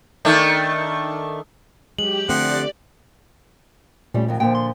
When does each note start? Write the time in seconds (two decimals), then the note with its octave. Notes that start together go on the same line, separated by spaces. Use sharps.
0.25 D#3 A3 D4
1.99 F#3 G#3 G4 F#7
2.29 D3 F3 A3 C4 D5 F#5
4.14 A#2 G3 A3 C#4
4.28 F2 D#3
4.40 A#2 D3 F3 G5
4.55 C6